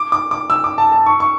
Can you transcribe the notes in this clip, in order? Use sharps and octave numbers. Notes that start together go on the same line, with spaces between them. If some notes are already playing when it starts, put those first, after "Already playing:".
Already playing: D6
D6
D6
E6
D6
A5
A5
C#6
C#6